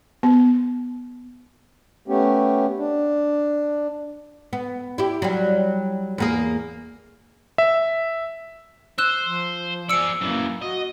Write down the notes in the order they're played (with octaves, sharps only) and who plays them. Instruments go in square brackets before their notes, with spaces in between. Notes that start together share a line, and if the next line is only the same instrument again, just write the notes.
[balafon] B3
[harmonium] A3 B3 C#4 G4
D4
[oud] B3
E4 G4
F#3 G3
E2 A#3 G#4
[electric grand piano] E5
[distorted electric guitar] C5 [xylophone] E6 F#6 E7
[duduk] F3
[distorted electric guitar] G#4 D5 [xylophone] E6 C#7
[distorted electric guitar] F#2 E3 [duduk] A#3
[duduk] F#4 [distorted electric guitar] D#5